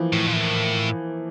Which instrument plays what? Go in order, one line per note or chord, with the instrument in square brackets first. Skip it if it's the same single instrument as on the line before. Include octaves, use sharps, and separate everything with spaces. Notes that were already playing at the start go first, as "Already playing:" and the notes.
Already playing: [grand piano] E3 F3 A#3
[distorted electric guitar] A2
A#2
A2